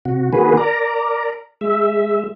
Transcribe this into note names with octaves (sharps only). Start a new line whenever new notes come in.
C3 F#4
D#3 A#3 F#4 G#4 B4
A#4 D5 A#5
G#3 E5